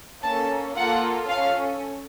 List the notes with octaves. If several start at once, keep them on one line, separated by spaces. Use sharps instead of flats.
A#3 C#4 A4 A5
A#3 F4 A4 F#5
C#4 A4 F5